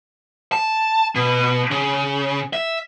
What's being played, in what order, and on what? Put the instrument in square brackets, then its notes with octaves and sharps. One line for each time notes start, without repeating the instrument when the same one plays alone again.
[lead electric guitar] A5
B2
C#3
E5